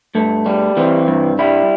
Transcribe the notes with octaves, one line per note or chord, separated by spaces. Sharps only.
G2 A3
G3
E3 C4
G2
G3 E4